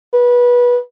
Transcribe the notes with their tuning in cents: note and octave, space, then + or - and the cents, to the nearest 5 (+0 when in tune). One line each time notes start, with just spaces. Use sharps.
B4 -20